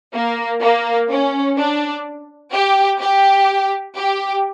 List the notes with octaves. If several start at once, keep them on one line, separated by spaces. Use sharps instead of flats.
A#3
A#3
C#4
D4
G4
G4
G4